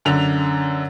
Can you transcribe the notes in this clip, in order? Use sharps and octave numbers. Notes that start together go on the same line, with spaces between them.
F#2 D3 F7